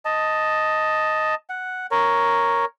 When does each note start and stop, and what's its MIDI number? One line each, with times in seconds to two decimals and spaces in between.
0.05 1.35 75
0.05 1.35 81
1.49 1.87 78
1.91 2.65 70
1.91 2.65 73